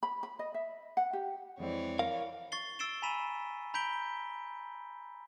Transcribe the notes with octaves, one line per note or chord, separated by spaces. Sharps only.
B5
B5
D#5
E5
F#5
G4
F2 E3 G#3 C4 C#5 D5
A#4 F5
C#6 A6 C7 G7
E6 A6 C7 D7 E7 G7
G#5 A#5 B5 B6 D#7 E7
A#5 B5 G6 B6 D7 G7